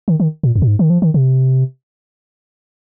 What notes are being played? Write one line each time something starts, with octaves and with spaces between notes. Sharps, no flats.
D#3
D#3
A#2
F2
A#2
G#2
D#3
F3
D#3
C3